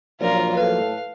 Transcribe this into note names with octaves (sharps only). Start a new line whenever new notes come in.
A#2 F3 F#3 A#3 D4 F4 A#4 D5
A2 A3 A4 B4 F5